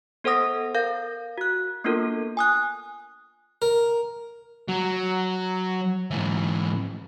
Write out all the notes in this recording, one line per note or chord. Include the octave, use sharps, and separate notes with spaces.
B3 A4 C5 F#5 D#6 A#6
A#4 F5 G6 A#6
F#4 F#6
A#3 B3 D4 F4 A4 A#4
G#5 D#6 F#6
A#4
F#3
G#2 E3